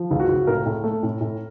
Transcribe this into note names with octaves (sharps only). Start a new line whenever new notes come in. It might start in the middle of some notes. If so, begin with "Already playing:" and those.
Already playing: F3
C#2
F#4
C#2
A2 A#4
A2
A3
A2
A2